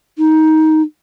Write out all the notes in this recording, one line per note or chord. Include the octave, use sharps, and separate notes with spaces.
D#4